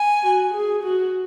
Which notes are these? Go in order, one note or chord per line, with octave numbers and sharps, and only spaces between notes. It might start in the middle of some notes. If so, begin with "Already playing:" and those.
Already playing: G#5
F#4
G#4
F#4